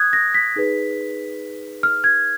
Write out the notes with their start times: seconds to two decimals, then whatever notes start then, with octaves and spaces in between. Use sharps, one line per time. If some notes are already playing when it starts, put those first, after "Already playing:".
Already playing: D#6 F#6 G#6
0.13 A#6
0.34 B6
0.56 D#4 G#4 B4
1.83 F6
2.04 G#6